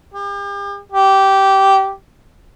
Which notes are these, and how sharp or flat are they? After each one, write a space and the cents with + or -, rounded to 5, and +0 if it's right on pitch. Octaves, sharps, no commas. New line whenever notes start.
G4 +40
G4 -15